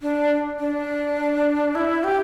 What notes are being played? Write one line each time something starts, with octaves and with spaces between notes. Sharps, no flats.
D4
D4
E4
G4